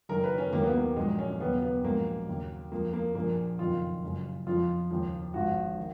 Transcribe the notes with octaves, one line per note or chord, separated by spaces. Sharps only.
F#1 F#2 D#3 A#4
B4
C#4
D#2 D#3 F#3 A#3
B3
A#3
A#1 A#2 F#3 G#3
C#4
C#4
D#2 C#3 F#3 B3
B3
A#1 G#2 F#3 A#3
D#2 C#3 F#3
F2 F3 A#3
A#3
A#1 A#2 F3 A#3
F#1 F2 D#3 F4
F#1 F#2 C#3
F2 F3 F4
D#2 C#3 F3
G#1 G#2 F3 F#4
D#3